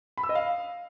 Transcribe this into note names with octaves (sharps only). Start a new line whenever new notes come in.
B5
E6
D#5
F5